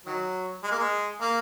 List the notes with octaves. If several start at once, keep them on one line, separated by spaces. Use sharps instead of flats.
D#3 F#3
G#3
A#3
G#3
A#3